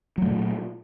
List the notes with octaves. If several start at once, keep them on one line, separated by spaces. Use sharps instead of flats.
A#2 F#3 A3